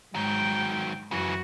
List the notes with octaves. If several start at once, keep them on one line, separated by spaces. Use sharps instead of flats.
G#2 D#3 F#3 G5
F#2 C#3 E3 F#4